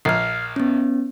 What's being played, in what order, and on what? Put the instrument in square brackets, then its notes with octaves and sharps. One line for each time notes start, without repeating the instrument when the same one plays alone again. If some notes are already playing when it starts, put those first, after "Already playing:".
[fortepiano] A#1 [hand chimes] F6 C7
[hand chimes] B3 C#4